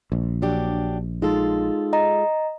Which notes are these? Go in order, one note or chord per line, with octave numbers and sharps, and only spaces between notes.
A#1
F#3 D4 G4
G#3 D#4 F4 A4
D#5 A#5